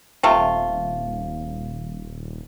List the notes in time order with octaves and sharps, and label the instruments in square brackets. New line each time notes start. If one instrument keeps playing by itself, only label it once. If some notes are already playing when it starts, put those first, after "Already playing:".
[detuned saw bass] D#1 [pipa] C3 A3 F4